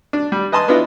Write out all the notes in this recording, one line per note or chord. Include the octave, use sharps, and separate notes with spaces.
D4
G3
B4 D#5 G#5 A5 C6 D#6
B3 D4 E4 F4 D#5